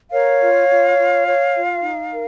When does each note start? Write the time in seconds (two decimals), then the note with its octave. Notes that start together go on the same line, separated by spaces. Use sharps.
0.11 A#4 C#5 F5
0.40 F4
0.69 F4
0.97 F4
1.25 C#5
1.54 F4
1.82 D#4
2.11 A#4